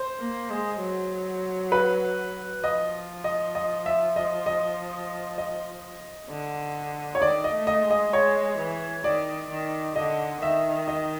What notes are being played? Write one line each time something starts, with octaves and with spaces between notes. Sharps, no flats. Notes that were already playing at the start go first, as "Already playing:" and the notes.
Already playing: C5
A#3
G#3
F#3
B4
F3 D#5
D#5
D#5
E5
D#5
D#5
D#5
D3
C#5
D#3 D5
D#5
A3
D#5
G#3
D#5
G#3 C#5
E3
D#3 D5
D#3
D3 D#5
D#3 E5
D#5